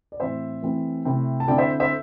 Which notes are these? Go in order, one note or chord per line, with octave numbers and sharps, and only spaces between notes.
D5
A2 E3 C4 E4 C5 E5
E3 A3 C4 E4
C3 A3 C4 E4
A5
D3 C4 E4 D5 G5
C5 E5
C5 E5